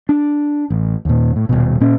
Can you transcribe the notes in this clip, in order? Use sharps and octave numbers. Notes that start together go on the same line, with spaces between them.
D4
A1
D#2 A#2
A2
D#1 C2 B2
A#2 C#4